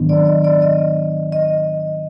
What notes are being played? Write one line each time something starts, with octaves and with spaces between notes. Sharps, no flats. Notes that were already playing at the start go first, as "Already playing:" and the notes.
Already playing: G#2 D#3 F#3 B3 D4
D5
D#5
D5
D#5
D#5